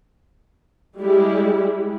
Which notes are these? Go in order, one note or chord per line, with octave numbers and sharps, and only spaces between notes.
G3 G#3 E4 G4